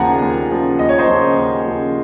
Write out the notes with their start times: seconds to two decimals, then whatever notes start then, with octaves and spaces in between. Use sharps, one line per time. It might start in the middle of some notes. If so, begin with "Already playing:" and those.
Already playing: D#2 C#3 F3 F#5 G#5 A#5
0.22 D#2
0.50 C#3 F3
0.79 D#2 D#5
0.89 C#5
0.99 C5 D#5
1.07 C#3 F3
1.36 D#2
1.65 C#3 F3